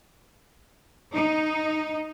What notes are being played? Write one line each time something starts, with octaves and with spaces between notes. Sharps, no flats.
D#4